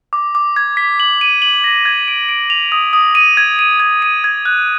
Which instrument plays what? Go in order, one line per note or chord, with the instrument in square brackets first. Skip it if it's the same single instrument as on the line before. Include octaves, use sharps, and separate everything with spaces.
[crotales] D6
D6
G#6
B6
F#7
D#7
F#7
A#6
G#6
D7
D7
F7
D#6
D#6
D#7
G#6
D#7
G#6
D#7
G#6
F#6